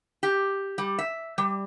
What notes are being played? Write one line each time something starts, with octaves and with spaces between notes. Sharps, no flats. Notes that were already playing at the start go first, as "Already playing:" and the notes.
G4
G3
E5
G3